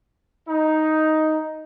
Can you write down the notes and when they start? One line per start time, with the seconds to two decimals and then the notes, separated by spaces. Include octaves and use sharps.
0.48 D#4